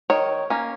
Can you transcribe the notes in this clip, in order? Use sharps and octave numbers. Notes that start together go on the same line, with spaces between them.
D#3 C#5
A#3 C#4